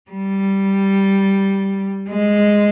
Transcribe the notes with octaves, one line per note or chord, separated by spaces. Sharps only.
G3
G#3